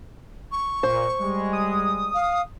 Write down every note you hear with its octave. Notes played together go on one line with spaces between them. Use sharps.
C#6
A#2 C5
G3 G#3
D#6
F5